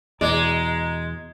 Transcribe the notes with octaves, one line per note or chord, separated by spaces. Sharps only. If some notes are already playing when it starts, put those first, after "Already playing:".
E2 B2 G#3 D5 A#5